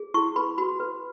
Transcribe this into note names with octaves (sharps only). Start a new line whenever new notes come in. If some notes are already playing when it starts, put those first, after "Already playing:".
Already playing: G#4
E4 C#6
B4 B5
F#4 B5
B4